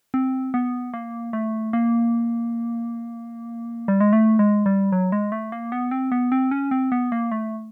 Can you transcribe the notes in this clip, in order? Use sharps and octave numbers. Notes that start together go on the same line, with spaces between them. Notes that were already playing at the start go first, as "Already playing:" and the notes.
C4
B3
A#3
A3
A#3
G3
G#3
A3
G#3
G3
F#3
G#3
A3
A#3
B3
C4
B3
C4
C#4
C4
B3
A#3
A3